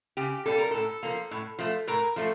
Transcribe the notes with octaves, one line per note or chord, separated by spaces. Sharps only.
C#3 G4
G3 A#3 A4
A#4
A2 A4
F3 A#3
A2
F3 A3
A2 A#4
F3 A3